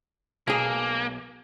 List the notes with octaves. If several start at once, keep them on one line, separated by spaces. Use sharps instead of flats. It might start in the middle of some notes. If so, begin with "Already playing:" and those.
B1 A#3 G#4